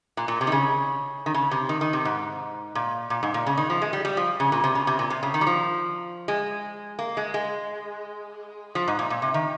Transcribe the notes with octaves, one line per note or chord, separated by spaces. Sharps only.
A#2
A#2
C3
D#3
C#3
D#3
C#3
C3
D#3
D#3
C3
G#2
A#2
A#2
G#2
A#2
C#3
D#3
F3
G#3
G3
G3
F3
C#3
A#2
C3
C#3
C3
A#2
C3
C#3
D#3
G3
F3
G#3
A#3
G#3
G#3
F3
G#2
A#2
A#2
C3
D#3